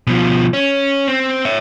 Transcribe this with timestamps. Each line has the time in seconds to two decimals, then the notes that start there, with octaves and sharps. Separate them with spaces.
0.07 B2 F3
0.54 C#4
1.08 C4
1.45 C#5 E5